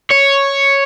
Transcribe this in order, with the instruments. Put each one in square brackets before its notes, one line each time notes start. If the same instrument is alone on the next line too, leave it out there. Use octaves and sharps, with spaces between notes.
[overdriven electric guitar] C#5